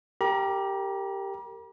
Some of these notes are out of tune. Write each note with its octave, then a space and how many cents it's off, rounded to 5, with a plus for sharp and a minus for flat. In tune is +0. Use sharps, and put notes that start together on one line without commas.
G4 +0 A#4 -25 A#5 +45